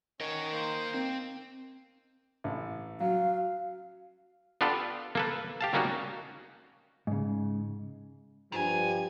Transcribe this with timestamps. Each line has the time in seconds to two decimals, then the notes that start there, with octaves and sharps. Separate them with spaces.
0.20 C#4 A#4 C#5 D#5 F#5
0.52 A#3 C5 C6
0.94 C4
2.44 A1
3.00 F#3 F5
4.61 B3 D4 F4 G4 A4 B4
5.15 A#3 A4 B4
5.61 G4 F5 A5
5.73 F#3 G3 A#3 C#4 D#4 F#4
7.07 G#2 C#3
8.52 G2 D#3 F3 G3 G#5